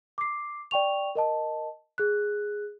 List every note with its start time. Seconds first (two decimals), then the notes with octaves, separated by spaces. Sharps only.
0.18 D6 C7
0.71 D5 G5 C#6 F7
1.15 A#4 D#5 A5
1.98 G#4 F#6